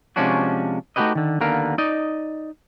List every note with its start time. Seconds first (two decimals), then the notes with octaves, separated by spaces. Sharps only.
0.16 C3 F3 G#3 C#4 D4 F#4
0.96 A3 D#4 F#4 G4 B4 D#5
1.15 D3 D#3
1.40 D#2 D3 B3 A#4 F5
1.78 D#4 D5 D#5